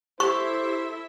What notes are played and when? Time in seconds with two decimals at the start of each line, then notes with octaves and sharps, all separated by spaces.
0.20 E4 G4 A4 C5 E5 C#6